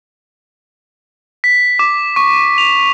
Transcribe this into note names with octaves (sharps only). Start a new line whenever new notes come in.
B6
D6
C#6
F7